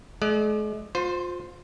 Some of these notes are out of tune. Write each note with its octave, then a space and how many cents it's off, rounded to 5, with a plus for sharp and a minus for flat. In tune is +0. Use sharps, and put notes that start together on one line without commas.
G#3 +45 D5 +30
F4 +30 C5 -10